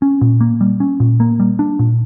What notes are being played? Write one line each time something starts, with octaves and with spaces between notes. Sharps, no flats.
C#4
A#2
A#3
G3
C#4
A#2
A#3
G3
D4
A#2